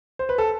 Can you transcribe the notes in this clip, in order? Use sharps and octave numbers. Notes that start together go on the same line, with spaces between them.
C5
B4
A4